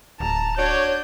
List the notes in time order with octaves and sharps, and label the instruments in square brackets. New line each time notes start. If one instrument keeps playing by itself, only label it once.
[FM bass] D1 [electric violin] A5 A#5
[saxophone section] D4 F#4 D5 [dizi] C#5 [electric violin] G6